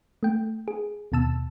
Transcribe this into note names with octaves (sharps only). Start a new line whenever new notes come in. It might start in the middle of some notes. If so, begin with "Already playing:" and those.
A3 G5
G#4
D#2 B2 A5 E6